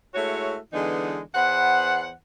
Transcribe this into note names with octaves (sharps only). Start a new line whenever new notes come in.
G#3 A3 E4 F#4 C#5
D3 E3 G#3 B3 D4 D#4
E2 B3 C5 F#5